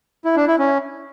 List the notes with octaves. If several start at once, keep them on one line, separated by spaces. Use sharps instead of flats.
E4
D4
E4
C#4